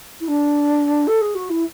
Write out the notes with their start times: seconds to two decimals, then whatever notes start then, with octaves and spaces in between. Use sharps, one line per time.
0.20 E4
0.27 D4
1.07 A4
1.21 G#4
1.34 F#4
1.49 E4